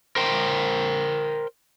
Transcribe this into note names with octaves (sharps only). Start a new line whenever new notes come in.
A#4 C5 G5